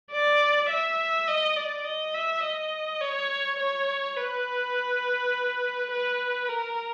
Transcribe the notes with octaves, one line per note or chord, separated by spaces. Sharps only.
D5
E5
D#5
D5
D#5
E5
D#5
C#5
C#5
B4
B4
A#4